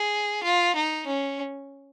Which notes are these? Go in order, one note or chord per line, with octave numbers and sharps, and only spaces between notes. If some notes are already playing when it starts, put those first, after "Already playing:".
Already playing: G#4
F4
D#4
C#4